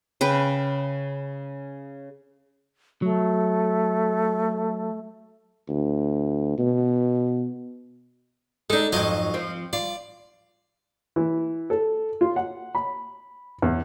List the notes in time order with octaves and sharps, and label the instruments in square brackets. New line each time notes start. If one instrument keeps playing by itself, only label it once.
[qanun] C#3 B4 G5
[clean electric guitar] F#3 [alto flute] A3
[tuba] D2
B2
[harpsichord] G#3 D#4 [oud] D4 A4
[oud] F2 G#2 F#3 [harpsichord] F4 D#5 F5
[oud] F3 C4
[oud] F4 [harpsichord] D5
[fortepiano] E3
A4
F4
F#5
B5
E2